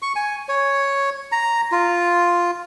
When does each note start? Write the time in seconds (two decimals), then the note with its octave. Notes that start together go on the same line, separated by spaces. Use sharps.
0.02 C#6
0.16 G#5
0.48 C#5
1.32 A#5
1.72 F4